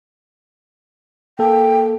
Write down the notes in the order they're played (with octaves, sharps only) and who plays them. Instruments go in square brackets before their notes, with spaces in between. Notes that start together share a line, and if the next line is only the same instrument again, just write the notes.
[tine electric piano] A#3 A4 [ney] G5